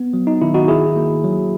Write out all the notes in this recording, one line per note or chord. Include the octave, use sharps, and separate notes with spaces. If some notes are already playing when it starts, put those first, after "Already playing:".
Already playing: B3
F#3
D#4
D#3 E4
D#4 F#4
G#1 E4 G#4
A#3
F#3